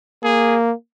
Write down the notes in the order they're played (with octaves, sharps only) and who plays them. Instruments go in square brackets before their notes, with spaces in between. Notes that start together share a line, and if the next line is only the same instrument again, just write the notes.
[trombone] A#3 [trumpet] G#4